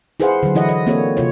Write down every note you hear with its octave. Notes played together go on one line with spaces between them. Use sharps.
E4 G#4 B4 C5 F5 F#5
D3 F#3
E3 E4 D#5 F#5
D#5
A#3 C4 D4 F#4 A4 C#5
C3 F4 C#5